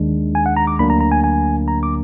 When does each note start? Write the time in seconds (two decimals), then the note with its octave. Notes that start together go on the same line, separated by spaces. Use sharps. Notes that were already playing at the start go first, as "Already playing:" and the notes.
Already playing: D#2 D#3 G#3 D4
0.35 G#5
0.46 F#5
0.57 A#5
0.67 D6
0.79 D2 D3 F#3 A#3 D4 B5
0.90 A#5
1.01 A#5
1.12 G#5
1.24 G#5
1.68 A#5
1.83 D6